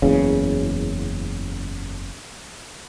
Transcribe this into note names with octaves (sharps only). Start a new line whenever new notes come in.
F#1 E2 C#3